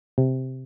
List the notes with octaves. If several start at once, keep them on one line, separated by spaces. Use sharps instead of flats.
C3